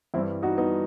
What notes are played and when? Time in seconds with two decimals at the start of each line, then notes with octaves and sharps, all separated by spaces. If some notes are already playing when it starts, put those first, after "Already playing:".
0.14 G2 E3 G3 C4 E4
0.43 D#4 F#4
0.57 B3 D#4